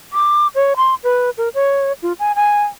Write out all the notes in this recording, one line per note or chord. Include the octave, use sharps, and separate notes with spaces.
D6
C#5
C6
B4
A#4
C#5
F4
G#5
G#5